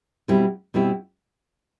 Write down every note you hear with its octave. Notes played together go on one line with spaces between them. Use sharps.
B2 G3 C4 E4
B2 G3 C4 E4